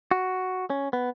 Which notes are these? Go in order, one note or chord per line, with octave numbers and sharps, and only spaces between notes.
F#4
C#4
B3